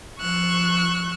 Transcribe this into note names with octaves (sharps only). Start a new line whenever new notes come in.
F3 C#6 E6 F#6